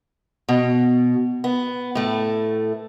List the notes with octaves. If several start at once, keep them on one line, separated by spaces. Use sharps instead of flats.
B2
B3
A2 A3